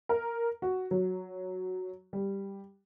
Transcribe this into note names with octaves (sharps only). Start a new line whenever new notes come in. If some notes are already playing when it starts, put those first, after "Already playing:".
A#4
F#4
F#3
G3